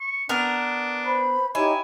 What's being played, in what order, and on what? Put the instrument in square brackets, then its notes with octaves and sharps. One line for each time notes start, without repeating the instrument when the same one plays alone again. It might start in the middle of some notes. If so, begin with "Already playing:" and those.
[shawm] C#6
[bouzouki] B3 A#4 [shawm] D4
[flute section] B4 C5 B5
[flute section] D#4 G4 C#5 [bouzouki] E4 [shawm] G#5